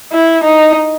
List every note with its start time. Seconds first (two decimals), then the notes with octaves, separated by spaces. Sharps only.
0.12 E4
0.44 D#4